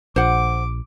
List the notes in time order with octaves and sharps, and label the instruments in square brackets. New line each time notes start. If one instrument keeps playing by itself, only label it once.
[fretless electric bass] A#1 [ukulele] C5 F#5 [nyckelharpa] D6